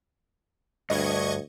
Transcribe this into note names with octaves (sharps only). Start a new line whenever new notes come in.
D2 G2 D#5 C#6 G#6